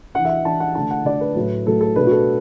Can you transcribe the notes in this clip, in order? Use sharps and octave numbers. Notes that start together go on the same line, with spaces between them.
E3 D4 F#5
E5
F#5
E3 D4 A5
F#5
D3 A3 D4 A5
F#5
D3 A3 D4 D5
B4
A2 F#3 A3
A2 F#3 A3 A4
A4
B2 A3 D4 B4
F#4
A4